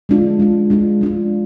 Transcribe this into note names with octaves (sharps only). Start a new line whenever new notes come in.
G#3 D4 F4
G#3 D4 F4
G#3 D4 F4
G#3 D4 F4